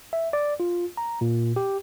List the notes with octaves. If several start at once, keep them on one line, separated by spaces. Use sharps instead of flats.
E5
D5
F4
A#5
A#2
G4